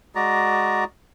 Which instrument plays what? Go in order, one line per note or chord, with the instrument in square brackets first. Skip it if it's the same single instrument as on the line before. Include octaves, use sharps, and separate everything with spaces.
[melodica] G#3 F#4 D5 A#5